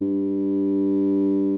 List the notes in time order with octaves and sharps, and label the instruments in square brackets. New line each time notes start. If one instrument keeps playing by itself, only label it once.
[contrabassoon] G2